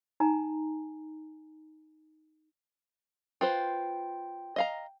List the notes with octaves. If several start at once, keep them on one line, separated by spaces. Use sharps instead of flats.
D#4 G#5 A#5
F4 B4 C5 G5
D#5 F5 A#5